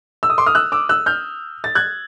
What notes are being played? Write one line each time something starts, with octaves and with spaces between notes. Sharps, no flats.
E6
D#6
C6 D6
D#6 F6
E6 F#6
D6 E6
E6 F#6
F6 G6
A6
F#6 G#6